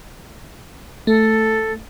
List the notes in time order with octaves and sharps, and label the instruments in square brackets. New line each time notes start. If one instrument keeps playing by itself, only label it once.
[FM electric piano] A3 [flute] A4